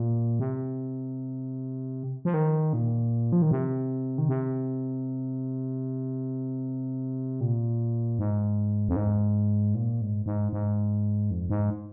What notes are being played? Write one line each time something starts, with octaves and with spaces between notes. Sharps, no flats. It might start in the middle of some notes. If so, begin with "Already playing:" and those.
Already playing: A#2
C3
F3
D#3
A#2
F3
D#3
C3
D#3
C3
A#2
G#2
F2
G#2
A#2
G#2
G#2
G#2
F2
G#2